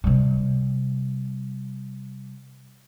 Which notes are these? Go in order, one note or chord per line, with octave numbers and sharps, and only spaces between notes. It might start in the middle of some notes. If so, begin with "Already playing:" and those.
C3 G3